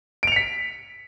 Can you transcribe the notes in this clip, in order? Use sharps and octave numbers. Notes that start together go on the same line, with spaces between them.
B6 C#7 D7 F7